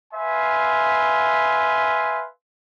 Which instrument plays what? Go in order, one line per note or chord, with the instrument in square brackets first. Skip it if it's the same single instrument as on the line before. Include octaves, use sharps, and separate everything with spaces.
[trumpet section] B4 E5 F5 G#5 C6